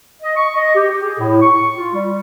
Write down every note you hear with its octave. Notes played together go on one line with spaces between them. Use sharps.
D#5
C#6
D#5
G4
G4
G#4
A2
C#6
F4
G3